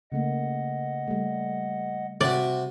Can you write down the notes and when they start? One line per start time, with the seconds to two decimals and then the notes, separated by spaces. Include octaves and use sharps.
0.12 C#3 A3 A#3 D#5 F#5
1.08 G3 A3
2.21 C3 F#4 D5